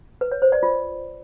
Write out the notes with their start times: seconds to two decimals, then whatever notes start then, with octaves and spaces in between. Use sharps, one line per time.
0.21 B4
0.32 C#5
0.42 C5
0.52 D5
0.63 F4